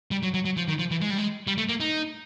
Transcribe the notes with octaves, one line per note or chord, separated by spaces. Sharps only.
G3
F#3
F#3
F#3
F3
D#3
F3
E3
G#3
G3
G#3
G3
A3
A#3
D#4